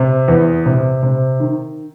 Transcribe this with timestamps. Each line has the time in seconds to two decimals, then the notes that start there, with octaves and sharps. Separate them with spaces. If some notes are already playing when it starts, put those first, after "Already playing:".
Already playing: C3
0.28 E2
0.66 C3
1.03 C3
1.40 D#3